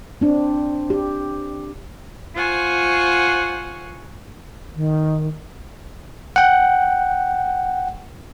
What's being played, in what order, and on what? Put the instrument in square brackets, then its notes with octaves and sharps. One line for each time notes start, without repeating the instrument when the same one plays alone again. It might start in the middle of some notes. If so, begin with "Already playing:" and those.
[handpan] C4 D4
G4
[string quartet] F4 C5 F#5 G#5 C#6
[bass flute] D#3
[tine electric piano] F#5 G5